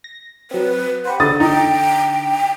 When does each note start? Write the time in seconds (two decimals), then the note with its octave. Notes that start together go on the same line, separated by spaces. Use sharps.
0.04 A#6
0.51 F#3 C4 B4
1.05 G4 B4 C5 F#5
1.20 D3 A4 D#6 A6
1.40 D#4 G5